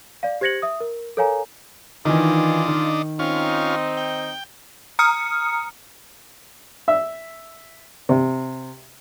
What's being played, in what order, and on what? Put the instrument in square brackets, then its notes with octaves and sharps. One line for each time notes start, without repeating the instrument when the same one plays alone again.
[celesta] D5 F5
G4 C5 G#6 A#6 C#7 F#7
E5 D#6
A#4
A4 A#4 C#5 F5 G#5 A#5
[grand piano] D#3 E3 [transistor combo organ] D4 D#4 [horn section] F4
[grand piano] D#3
[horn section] C4 D#4 [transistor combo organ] C#4 F4
[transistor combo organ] G5
[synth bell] A#5 D#6 F6 C#7
[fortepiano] E5
C3